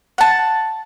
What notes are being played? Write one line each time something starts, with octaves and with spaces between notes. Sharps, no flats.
F#5 A5